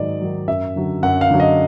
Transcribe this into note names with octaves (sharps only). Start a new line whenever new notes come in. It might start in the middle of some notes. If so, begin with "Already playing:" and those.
Already playing: G#2 D#3 F#3 D5 D#5
D#3 F#3
F#2 E5
D3 F#3
F#2 F#5
F5
D3 F#3
D#5